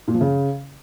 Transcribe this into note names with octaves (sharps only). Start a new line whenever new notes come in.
A#2
F3
C#3